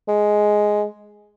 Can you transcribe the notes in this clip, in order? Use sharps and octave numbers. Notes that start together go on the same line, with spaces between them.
G#3